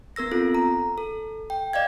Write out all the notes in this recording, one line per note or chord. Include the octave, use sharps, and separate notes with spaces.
B3 A#4 E6 A#6
C4 F4 A4
A#5
A4
G5
D5 D#5 F5 G#6